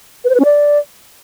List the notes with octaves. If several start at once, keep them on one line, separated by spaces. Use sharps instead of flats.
B4
C5
B4
C#4
D5